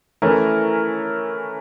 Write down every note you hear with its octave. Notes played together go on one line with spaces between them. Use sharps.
E3 A3 C#4 E4 A#4